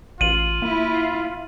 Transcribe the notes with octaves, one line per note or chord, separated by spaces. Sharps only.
A1 F4 D#7 F#7
A#3 E4